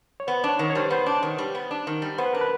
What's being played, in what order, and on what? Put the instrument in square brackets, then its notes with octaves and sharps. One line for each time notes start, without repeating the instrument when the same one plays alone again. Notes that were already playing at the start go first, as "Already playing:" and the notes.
[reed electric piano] C#5
[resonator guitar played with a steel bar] B3 [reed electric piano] C5
[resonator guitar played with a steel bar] D4
[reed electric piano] C#5
[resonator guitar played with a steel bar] D#3
[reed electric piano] C#5
[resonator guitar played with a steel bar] G3 [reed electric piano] C5
[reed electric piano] B4
[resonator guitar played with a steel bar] B3 [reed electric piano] C5
[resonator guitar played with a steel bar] D4
D#3
G3
B3
D4
D#3
G3
[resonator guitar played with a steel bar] B3 [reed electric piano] C5
[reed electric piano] B4
[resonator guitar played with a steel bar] D4 [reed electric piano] A#4
[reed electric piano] B4